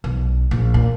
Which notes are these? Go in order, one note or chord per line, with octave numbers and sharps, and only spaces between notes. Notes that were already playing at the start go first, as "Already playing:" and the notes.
B1
A#1
A#2